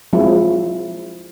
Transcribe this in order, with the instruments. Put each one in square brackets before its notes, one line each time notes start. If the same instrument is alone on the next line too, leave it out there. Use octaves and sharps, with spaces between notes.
[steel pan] F3 F#3 G#3 C4 E4